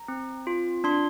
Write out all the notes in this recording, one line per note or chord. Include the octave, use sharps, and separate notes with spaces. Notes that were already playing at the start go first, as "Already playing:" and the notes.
Already playing: A#5
C4
F4
D4 C6